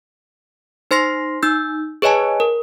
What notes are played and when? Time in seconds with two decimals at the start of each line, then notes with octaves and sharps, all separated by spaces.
0.91 D#4 C5 C6 A#6 C7
1.43 D#4 E6 G6
2.02 G#4 B4 C#5 D#5 G#5 A5
2.40 A#4